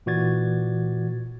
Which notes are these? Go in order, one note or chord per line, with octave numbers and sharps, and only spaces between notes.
A#2 E3 F#4 D5 G#6 A6